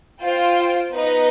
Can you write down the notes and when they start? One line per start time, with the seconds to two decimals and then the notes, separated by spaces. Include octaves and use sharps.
0.22 F4 C5 G5
0.92 B3 D#4 B4 D#5